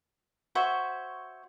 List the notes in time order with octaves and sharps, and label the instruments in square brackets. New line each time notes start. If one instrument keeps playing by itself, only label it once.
[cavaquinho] F#4 C5 C#5 E5